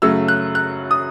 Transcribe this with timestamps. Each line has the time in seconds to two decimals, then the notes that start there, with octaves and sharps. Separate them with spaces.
0.02 F#2 C#3 F#3 A3 E6
0.28 F#6
0.55 F#6
0.91 D#6